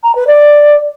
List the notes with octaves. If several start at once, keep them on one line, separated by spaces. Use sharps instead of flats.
A#5
B4
D5